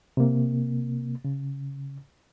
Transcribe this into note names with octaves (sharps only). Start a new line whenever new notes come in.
C3 A#3
C#3